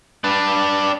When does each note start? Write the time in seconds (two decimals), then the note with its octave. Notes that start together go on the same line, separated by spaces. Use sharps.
0.24 D4 B4